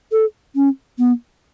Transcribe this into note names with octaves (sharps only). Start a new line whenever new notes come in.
A4
C#4
B3